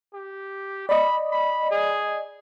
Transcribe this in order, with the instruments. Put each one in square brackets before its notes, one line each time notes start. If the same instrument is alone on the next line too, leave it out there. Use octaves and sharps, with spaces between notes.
[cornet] G4
[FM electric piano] D5 D#5 [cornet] B5
[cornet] B5
G#4